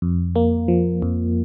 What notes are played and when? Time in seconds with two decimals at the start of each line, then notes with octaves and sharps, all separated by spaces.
0.02 F2
0.36 A#3
0.68 F3
1.02 F2